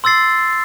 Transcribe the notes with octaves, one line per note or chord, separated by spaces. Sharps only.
C6 E6 A6 C7